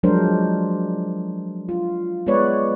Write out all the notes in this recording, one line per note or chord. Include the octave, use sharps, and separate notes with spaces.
F3 F#3 G#3 D4 A#4 C5
F4
G#3 B3 B4 C#5 D5